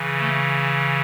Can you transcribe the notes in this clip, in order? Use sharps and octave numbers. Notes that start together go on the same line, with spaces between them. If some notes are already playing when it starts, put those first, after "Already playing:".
Already playing: C#3 E3
A3